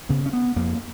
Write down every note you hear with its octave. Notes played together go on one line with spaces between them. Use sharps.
C#3 B3
C#4
B3
F2 A#3